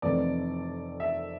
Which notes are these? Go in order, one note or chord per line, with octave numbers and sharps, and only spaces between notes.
F1 F2 E3 A3 C4 D5
E5